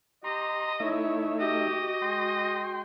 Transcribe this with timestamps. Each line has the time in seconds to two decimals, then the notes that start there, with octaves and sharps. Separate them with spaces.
0.24 G4 D#5 A#5 C6
0.80 A3 D#4 E4 C#5 E5
1.39 F#4 G4 D#5
2.02 G#3 G5 C6